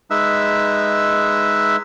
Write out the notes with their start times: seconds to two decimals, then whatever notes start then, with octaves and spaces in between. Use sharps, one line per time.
0.11 G#3 D#4 B4 E5 E6